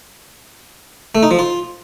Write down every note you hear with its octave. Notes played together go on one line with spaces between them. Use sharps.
A3
D#4
F3
F4